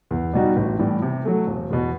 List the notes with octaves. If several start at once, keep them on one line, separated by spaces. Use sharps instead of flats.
E2
B2 G3 D#4 F#4
A1
A2 E3 G3
C3
F#3 A3
E1
E2 B2